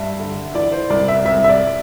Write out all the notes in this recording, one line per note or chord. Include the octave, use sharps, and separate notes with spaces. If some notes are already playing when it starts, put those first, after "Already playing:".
Already playing: G2 E5
D3
E3 D5
C5
C2 D5
E5
C2 E5
E5
D5